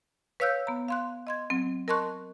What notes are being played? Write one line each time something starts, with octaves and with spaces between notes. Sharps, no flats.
B4 C#5 F5 E6 F#6 G6
B3 A#5
F5 C6 F#6
D#5 C6 G#6
F#3 C4
A#4 D#5 A5 C6 C#6 F#6